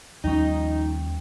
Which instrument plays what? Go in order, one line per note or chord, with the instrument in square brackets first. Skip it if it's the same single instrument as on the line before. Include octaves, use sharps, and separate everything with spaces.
[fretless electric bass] D#2 F3 G3 [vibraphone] C#4 G5 [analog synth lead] D#4